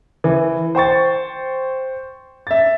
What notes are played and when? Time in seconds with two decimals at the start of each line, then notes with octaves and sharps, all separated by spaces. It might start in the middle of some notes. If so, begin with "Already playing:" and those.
0.24 E3
0.75 C5 G5 C#6 A6
2.47 E5 A6